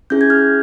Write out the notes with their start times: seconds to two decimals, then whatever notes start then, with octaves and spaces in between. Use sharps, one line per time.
0.10 C#4 E4 G#4 G6
0.21 G#6
0.30 F6 G6